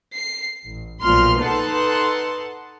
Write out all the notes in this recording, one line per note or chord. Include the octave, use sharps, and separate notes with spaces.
C7
A1
B1 A#2 F3 C6 F6 C7
D#4 A4 B4 F#5 A5 C6